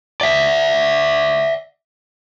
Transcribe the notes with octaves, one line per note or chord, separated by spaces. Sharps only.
D5 E5